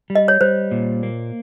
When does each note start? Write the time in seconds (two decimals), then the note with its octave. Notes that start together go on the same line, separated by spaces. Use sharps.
0.10 G3
0.15 D#5
0.28 C#5
0.41 G3 C5
0.71 A#2
1.03 A#3